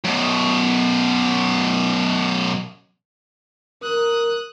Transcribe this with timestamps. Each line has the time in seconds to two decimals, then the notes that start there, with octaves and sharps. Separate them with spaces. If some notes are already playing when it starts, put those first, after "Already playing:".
0.04 F#2 B2
3.83 A#4 D#6 F#6